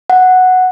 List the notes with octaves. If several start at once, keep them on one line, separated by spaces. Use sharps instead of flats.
F#5